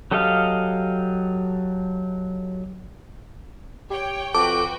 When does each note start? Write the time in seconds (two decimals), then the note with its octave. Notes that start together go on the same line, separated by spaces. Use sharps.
0.11 F#3 G4 A4 D#5 F5
3.90 G4 C#5 G5
4.35 F2 F#4 A4 B4 G5 D6